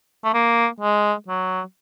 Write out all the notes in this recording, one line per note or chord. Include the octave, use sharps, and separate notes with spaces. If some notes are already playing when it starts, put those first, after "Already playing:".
A3
A#3
G#3
F#3